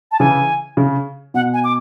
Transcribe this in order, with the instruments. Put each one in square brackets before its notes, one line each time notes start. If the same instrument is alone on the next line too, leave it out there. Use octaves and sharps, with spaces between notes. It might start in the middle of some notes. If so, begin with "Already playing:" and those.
[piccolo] A5
[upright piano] C#3 E3 [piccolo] G#5
[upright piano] C#3
[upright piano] B2 [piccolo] F#5
[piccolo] G#5
D6